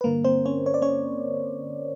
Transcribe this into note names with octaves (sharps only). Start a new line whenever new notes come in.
B4
G2 D3 A#3 A#4
C4 C5
C#4 C#5
C#5
D5
C#4 C#5